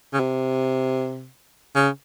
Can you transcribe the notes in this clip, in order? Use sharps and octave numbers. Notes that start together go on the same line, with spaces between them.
C#3
C3
C#3